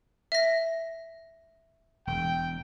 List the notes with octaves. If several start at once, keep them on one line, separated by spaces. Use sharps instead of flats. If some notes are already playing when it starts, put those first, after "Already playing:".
E5 A#6
E1 G5